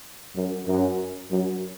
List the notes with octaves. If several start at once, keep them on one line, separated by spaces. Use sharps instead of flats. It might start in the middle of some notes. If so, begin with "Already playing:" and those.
F#2
F#2
F#2